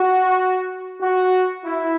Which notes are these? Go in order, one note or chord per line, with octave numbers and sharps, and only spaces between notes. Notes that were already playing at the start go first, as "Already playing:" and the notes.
Already playing: F#4
F#4
E4